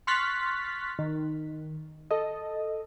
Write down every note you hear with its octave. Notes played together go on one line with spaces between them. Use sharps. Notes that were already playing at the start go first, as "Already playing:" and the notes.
C6 C#6 F6 F#6 A6 B6
D#3
A4 D#5